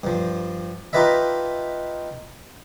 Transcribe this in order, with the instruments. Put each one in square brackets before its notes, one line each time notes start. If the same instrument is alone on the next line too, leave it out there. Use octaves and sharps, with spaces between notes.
[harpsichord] G2 F3
D#4 F4 G4 B4 D#5 E5